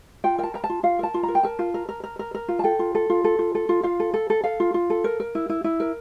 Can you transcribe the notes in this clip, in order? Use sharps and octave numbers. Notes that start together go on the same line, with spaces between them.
F4 G5
A#4 G5 A5
A#4 A#5
A5
F4
F4 F5
A#4 A5
F4
A#5
A#4
G5
A#4 A5
F4
A#4
A#4
A#4
A#4
A#4
F4
A5
A4 G5
F4
A4
F4
A4
F4
A4
F4
F4 F5
A4
A4
A4
A4 F5
F4
F4
A4
A#4
A#4
E4
E4
E4
A#4